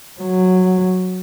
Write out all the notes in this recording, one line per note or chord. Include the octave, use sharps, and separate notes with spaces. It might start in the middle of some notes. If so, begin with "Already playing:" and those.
F#3